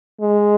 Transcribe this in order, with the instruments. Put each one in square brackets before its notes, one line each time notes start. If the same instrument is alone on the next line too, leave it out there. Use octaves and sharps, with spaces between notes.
[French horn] G#3